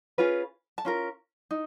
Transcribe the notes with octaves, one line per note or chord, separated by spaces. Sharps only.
C#4 F4 G#4 B4
A5
C#4 F4 A#4
D#4